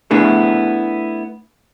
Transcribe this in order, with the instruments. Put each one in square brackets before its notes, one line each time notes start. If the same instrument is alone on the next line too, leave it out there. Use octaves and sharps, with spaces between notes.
[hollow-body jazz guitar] A3 B3 D4 E4 G#4